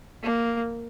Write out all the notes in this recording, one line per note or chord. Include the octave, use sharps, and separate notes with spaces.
A#3